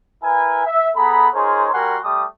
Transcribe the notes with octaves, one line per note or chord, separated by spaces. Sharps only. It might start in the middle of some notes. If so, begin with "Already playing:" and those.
E4 A#4 B4 G#5
E5
B3 G#4 A4 A#5 B5
D#4 F4 G#4 A#4 C5 C#5
G3 F#4 A#4 F#5 G#5 C6
G3 A3 D6 D#6